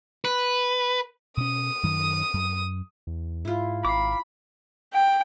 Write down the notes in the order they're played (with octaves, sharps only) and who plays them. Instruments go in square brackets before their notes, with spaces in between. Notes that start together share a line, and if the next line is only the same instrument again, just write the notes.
[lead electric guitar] B4
[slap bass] B2 C#4 [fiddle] D#6
[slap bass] F#2 D#3
F#2
[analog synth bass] E2
[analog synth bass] G#2 [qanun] E4 F4
[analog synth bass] G#1 [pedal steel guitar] F5 D6 [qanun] A#5 [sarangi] B5
[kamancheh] G5